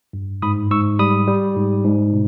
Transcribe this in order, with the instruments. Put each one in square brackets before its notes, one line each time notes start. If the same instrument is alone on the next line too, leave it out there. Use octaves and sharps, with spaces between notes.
[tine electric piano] G2
G#2 B5 D#6
G#2 C#6 E6
G3 B5 D#6
G3
G#2
G#2
B2